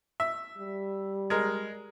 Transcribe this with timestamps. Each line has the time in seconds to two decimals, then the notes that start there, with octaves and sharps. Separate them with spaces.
0.20 E5
0.58 G3
1.30 G#3 A#4